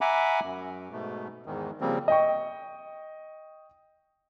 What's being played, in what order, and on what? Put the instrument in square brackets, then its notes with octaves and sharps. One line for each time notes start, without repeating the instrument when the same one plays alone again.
[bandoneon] E5 F#5 G#5 A#5 B5 D6
F#2
G#2 B2 A3
E2 G#2 D#3
C#3 F3 G3 A#3 C4
[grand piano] D#5 G5 C#6